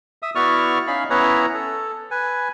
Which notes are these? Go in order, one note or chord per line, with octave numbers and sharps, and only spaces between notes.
E5 D#6
B3 E4 F#4 D5 C#6 F6
C#4 D#4 F5 B5
B3 C#4 E4 B4 C#5 A#5
A4
B4 G#5